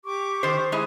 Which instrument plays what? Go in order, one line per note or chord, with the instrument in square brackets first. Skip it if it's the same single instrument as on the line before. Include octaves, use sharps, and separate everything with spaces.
[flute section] G4 C#6 D6
[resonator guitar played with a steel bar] D#3 C5
G#3 E4 G#4